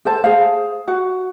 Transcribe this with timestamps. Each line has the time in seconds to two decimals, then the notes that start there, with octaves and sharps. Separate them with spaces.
0.05 A4 C5 A5
0.24 G#4 C5 F5
0.88 F#4 F#5